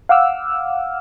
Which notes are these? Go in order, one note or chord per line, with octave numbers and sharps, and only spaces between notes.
F5 F#5 D6 E6 F6